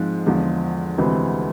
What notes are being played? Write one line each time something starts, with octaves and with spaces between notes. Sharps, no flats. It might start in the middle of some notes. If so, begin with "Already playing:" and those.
Already playing: G#2 F3 G#3 C4
E2 D3 F3 G#3
D2 C3 E3 G#3 C4